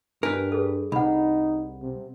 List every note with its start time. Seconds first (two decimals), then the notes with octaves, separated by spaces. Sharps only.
0.23 G2 D4 A#4 B4
0.52 G#4 A4
0.92 C2 D#4 F#5 B5
1.82 C3